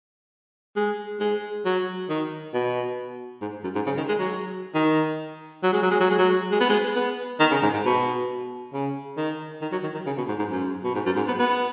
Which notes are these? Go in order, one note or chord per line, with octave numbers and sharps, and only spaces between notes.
G#3
G#3
F#3
D#3
B2
G#2
F#2
G#2
C#3
D#3
G#3
F#3
D#3
F#3
G#3
F#3
G#3
F#3
G#3
F#3
G#3
B3
G#3
B3
D#3
C#3
G#2
G#2
B2
C#3
D#3
D#3
F#3
D#3
D#3
C#3
B2
G#2
G#2
F#2
B2
G#2
F#2
G#2
B3
B3